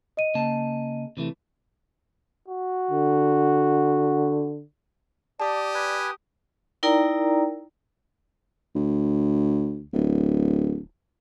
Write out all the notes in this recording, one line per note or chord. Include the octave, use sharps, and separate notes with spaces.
D#5 D#7
C#3 A#3 A5
C3 E3 A3
F#4
D3
G4 D5 A5 D#6
B4 G#5
D#4 E4 A#4 D5 G5 A#5
D2
D1